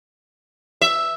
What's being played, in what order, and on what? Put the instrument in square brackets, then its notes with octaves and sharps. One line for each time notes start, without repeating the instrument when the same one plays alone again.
[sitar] E5